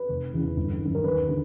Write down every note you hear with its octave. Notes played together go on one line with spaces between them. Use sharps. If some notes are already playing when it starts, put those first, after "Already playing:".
Already playing: B4
F1
E2 C#3 E3
G1
F#2 D#3
A#4
D#2 B4
D3